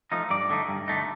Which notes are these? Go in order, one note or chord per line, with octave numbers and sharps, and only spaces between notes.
F3 A3 D#4
G2 D5
D3 A3 D#4
G2
D3 A3 D#4